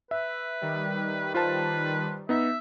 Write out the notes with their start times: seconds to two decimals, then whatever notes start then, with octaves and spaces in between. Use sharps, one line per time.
0.11 B4 E5
0.61 D#3 G3
1.34 F4 B4 C5 A5
2.29 B3 D#4 E5